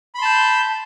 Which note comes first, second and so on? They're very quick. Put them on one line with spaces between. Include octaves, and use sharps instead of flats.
B5 C6 A5 G6